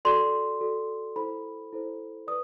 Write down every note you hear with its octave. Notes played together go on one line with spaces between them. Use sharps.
F#4 A4 D5 C6
F#4 A4 D5
E4 A4 C5 B5
E4 A4 C5
B4 D5 D#6